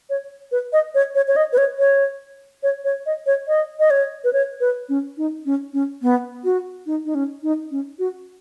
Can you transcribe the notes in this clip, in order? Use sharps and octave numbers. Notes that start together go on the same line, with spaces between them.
C#5
B4
D#5
C#5
C#5
C#5
D#5
B4
C#5
C#5
C#5
C#5
D#5
C#5
D#5
D#5
C#5
B4
C#5
B4
C#4
D#4
C#4
C#4
B3
F#4
D#4
D#4
C#4
D#4
C#4
F#4